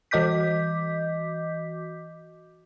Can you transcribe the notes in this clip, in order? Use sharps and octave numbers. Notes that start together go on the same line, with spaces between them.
E3 F#4 D#5 D6 G6 B6